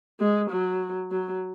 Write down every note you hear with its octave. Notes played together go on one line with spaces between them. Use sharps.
G#3
F#3
F#3